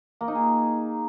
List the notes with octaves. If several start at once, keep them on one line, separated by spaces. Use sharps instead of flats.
A#3
D#4
G#4